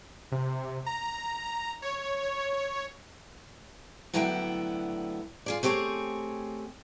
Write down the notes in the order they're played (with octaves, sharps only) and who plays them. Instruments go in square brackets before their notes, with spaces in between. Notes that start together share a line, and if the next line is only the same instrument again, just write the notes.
[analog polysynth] C3
A#5
C#5
[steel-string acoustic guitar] A2 D3 F#3 B3 E4 G5
F4 G#4 D5
A3 C4 G4 G#4 C#5